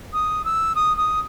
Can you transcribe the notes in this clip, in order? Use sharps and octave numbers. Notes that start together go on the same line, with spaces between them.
D#6
E6
D#6
D#6